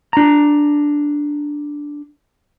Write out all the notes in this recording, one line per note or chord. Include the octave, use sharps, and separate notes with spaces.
D4 A#5